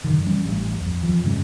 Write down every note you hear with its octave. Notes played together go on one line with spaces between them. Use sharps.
F#2 D3 D#3
E3 G3 C#4
A1 G2
F2
F2 E3 F3
G2 C#3 G#3 C#4